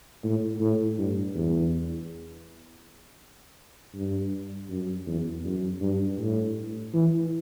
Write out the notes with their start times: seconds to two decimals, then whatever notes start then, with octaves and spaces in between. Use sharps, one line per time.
0.24 A2
0.60 A2
0.99 G2
1.35 E2
3.95 G2
4.70 F#2
5.07 E2
5.45 F#2
5.81 G2
6.19 A2
6.94 E3